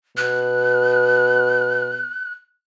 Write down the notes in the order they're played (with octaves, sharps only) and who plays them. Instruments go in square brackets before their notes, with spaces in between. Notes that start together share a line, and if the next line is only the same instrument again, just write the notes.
[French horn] B2 [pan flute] F#6